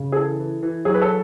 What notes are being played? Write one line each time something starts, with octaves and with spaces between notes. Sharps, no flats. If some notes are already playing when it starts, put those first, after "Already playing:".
Already playing: C#3
G#4
E3 A4
E3
E3
F#3 G#4
B4
A4